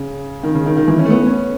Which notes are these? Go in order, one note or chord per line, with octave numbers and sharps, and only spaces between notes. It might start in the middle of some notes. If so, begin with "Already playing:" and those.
Already playing: C#3
D#3
C#3
D#3
D#3
E3
C#4
A3
B3
C#4